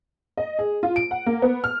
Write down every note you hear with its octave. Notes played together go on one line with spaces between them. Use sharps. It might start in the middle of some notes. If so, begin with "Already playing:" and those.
D#5
G#4
F4
D7
F#5
A#3
B3
F6